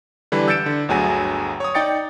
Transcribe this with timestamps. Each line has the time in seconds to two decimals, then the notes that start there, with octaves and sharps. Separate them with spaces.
0.32 D3 E3 G3 D4 B4
0.48 E6 G6 A6 C#7 D7 E7
0.66 D3
0.89 G1 D2 F#3 G#4 G#5
1.60 C#5 D#6
1.75 D#4 D5 G5 A6 C#7